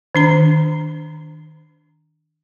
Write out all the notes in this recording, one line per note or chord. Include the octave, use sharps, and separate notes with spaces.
D#3 D4 A#5